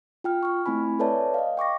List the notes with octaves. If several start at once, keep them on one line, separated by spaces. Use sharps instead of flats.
F4 G5 F6
C#6 F6
A3 C4 E4 G#5 B5
A4 B4 C#5 D5 E5 A5
D#5 F5
G5 C#6 D6 A#6